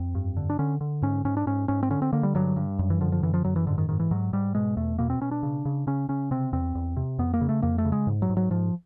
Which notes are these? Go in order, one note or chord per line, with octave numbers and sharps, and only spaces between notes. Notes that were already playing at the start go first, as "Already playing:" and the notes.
Already playing: F2 C4
G2
D3
D4
D3 C#4
D3
G#2 C#4
G#2 C#4
D4
G#2 C#4
G#2 C#4
C4
D3 C#4
C4
D3 A#3
G3
G2 F#3
G2
F#2
E3
D3 F3
F3
F#2 E3
F3
F#2 F#3
E3
G#2 D3
D#3
G#2 D#3
E3
G#2 F#3
G#2 G3
B2 G#3
E2 A3
B2 A#3
C4
B2 C#4
D4
C#3
C#3
C#3 C#4
C#3 C#4
C3 C4
E2 C4
E2
C3
F2 B3
A#3
C#3
A3
F2 A#3
A3
C#3
G#3
G#2
F#3
G#2
F#3
G#2 F3